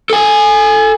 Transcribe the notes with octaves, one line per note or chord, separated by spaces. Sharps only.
A4 G#5